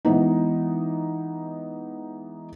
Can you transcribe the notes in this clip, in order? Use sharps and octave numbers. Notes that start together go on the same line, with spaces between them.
E3 G#3 B3 D#4